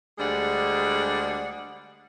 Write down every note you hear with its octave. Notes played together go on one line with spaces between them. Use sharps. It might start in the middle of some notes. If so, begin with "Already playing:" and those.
D2 G3 G#3 D4 G#4 F#5